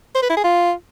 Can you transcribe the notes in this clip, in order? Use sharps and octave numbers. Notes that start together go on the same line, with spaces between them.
C5
B4
E4
G#4
F4